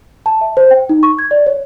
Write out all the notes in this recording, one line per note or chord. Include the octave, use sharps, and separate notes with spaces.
A5
E5
C5
G5
D#4
C#6
G#6
D5
C#5